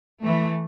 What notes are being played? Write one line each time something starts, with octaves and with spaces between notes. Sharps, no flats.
E3 A3